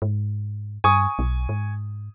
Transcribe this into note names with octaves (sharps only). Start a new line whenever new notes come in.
G#2
G2 G#5 C#6 D#6
B1
G#2